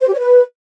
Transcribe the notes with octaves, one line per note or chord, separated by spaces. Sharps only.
C5
G4
C#5
B4